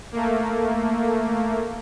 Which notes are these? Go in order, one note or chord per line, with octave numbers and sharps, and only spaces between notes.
A3 A#3